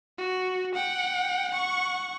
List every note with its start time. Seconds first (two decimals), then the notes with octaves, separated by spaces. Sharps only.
0.18 F#4
0.75 F#5 G5
1.51 F#5 C#6